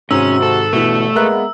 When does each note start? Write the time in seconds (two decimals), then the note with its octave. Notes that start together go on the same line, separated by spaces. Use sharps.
0.11 G#2 C3 D#3 C#4 F#4 E6
0.42 A4
0.73 G1 B2 E3 A3
1.15 G#3 A#3 B3 A#4 E5 F#6